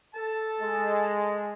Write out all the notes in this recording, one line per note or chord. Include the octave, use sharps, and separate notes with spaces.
A4 A5
G#3